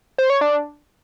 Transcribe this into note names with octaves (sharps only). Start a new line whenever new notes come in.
C5
C#5
D4